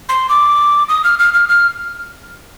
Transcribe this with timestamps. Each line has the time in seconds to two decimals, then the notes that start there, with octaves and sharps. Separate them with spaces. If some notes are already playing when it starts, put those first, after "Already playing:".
0.09 C6
0.29 D6
0.89 D#6
1.04 F6
1.19 F6
1.34 F6
1.49 F6